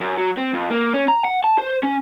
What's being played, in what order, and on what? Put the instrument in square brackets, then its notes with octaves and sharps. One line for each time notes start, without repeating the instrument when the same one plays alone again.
[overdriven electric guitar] F#2
F#3
C4
F2
A#3
C#4
A#5
F#5
A5
C5
C#4